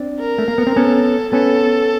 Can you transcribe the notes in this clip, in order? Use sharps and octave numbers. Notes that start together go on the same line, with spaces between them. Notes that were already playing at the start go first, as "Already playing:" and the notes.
Already playing: C4 D4
A#4
A3
A#3
B3
C4
B3 C#4 A4
B3 C#4 A4